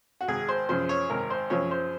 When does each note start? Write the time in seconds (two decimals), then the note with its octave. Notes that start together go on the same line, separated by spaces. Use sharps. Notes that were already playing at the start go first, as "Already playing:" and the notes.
0.21 F#4
0.28 G#1 G#4
0.48 C5
0.69 F#2 C#3 F3 C5
0.89 C#5
1.10 G#1 A#4
1.30 C5
1.50 F#2 C#3 F3 C#5
1.71 C5